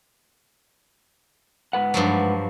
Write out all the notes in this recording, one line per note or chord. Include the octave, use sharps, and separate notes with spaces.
G#2 B4 F#5
G2 F3 F#3